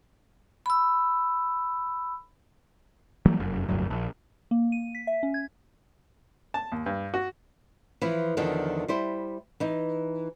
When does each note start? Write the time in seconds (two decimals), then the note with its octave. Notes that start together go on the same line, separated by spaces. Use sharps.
0.66 B5 E6
3.26 E3 F#3 G3 A#3
3.40 F1 F#2
3.69 F1 D2 G2 F#3
3.90 A#1
4.51 A#3
4.72 D#7
4.95 B6
5.07 E5
5.23 C#4
5.34 G#6
6.54 A5
6.72 D#2
6.86 G2
7.14 F#4
8.02 E3 F3 E4
8.37 E2 D3 D#3 F3
8.88 G3 E4 C5
9.60 E3 D#4